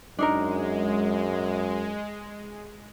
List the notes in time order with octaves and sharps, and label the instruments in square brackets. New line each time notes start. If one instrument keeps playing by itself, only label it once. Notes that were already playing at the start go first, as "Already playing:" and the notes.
[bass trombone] F#2 [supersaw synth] G#3 [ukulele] D4 D#4 A#4